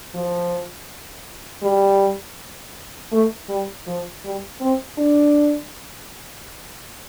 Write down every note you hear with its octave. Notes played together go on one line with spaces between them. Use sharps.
F3
G3
A3
G3
F3
G3
C4
D4